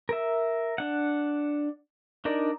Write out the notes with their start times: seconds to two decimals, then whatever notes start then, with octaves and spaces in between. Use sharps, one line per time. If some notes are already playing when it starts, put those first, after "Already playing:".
0.09 A#4 E5
0.78 D4 F#5
2.25 D4 D#4 A#4 D5